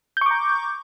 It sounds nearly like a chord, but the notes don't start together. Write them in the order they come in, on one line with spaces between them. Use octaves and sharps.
G6 C#6 D6 A#5